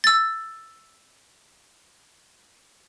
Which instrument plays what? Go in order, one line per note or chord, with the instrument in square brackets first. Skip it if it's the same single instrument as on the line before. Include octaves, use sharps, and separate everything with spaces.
[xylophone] E6 A6